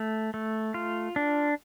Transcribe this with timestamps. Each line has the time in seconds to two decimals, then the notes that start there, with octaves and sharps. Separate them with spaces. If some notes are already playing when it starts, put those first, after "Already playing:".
Already playing: A3
0.34 A3
0.74 F4
1.16 D4